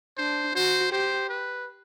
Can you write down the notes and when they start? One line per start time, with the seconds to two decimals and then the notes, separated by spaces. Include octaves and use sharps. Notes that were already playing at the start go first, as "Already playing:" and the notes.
0.18 D4 C5
0.55 F#4 C5
0.92 G4 C5
1.29 B4